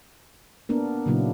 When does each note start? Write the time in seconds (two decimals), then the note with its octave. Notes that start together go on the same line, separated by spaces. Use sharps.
0.69 A#3 B3 D4 A#4
1.06 A#2 C#3 F#3 A#3 D4 E4